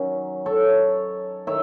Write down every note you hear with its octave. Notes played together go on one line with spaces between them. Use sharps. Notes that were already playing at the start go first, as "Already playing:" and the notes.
Already playing: D#3 F#3 C#4
A4 C#5
D#3 C#5 E5